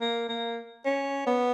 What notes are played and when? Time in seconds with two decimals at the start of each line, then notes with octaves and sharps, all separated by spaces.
0.01 A#3
0.29 A#3
0.85 C#4
1.27 B3